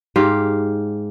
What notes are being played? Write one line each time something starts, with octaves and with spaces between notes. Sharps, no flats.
G#2 G4 F5